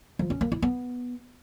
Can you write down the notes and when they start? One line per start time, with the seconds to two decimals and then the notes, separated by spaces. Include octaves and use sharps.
0.19 F3
0.30 C#4
0.41 A#3
0.52 E4
0.62 B3